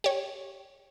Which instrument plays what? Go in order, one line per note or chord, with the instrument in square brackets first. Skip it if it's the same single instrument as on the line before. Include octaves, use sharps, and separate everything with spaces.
[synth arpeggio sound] G4 C#5